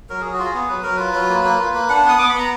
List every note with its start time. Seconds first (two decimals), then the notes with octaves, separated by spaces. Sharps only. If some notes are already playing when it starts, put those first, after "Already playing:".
0.10 F#3 A#4
0.21 F#3 G#4
0.34 F#4
0.39 F4
0.45 G#4
0.54 B3
0.69 F#3 B4
0.83 F#3 A#4
0.96 F4 B4
1.14 F#3
1.29 A#3
1.44 A#3
1.59 F4
1.74 A#3
1.89 D4 F#5
2.04 B3 D#6
2.19 B3 D6
2.29 B5
2.35 B3 A#5